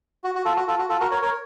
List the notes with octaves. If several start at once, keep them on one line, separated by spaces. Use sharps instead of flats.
F#4
F#4
F4 A4
F#4
F4 A4
F#4
F4 A4
F#4 A#4
A#4 C#5
A#4 C#5